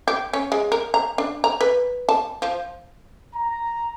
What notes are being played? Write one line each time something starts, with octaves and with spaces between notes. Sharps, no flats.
G4
C#4
G#3
A#4
A#5
D4
A#5
B4
A5
F3
A#5